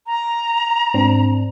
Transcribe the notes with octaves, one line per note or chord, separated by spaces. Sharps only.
A#5
G#2 C4 D4